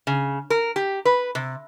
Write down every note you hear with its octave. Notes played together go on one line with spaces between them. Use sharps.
C#3
A#4
G4
B4
C3